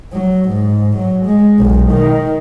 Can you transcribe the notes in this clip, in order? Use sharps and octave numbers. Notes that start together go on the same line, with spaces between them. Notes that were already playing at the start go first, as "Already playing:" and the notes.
F#3
G#2
F#3
G#3
B1
D#3